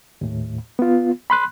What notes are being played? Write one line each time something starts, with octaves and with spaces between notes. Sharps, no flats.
D#2 A2
B3 F4
B5 C6 F#6